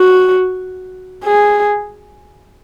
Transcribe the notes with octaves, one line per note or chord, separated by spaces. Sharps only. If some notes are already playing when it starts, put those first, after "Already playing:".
Already playing: F#4
G#4